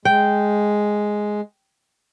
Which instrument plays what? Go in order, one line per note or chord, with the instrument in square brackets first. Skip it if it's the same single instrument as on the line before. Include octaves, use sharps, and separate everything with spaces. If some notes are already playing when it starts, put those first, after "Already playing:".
[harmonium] G#3 [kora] G5